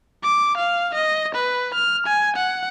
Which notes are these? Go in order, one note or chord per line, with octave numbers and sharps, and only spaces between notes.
D6
F5
D#5
B4
F6
G#5
F#5